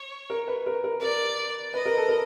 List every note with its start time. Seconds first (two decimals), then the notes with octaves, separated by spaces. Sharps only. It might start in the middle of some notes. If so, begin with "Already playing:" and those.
Already playing: C#5
0.30 A#4
0.48 B4
0.66 A#4
0.84 A#4
1.01 A#4 D5
1.73 B4 D#5
1.86 A#4
1.97 A4
2.09 A#4